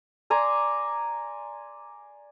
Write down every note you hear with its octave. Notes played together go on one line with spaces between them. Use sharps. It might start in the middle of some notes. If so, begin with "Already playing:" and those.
D5 G#5 A#5 C6